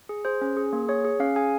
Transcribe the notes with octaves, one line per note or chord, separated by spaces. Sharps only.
G#4
G#4 C5
C#4
G#4
A#3
G#4 C#5
G#4
C#4 F5
G#4 G#5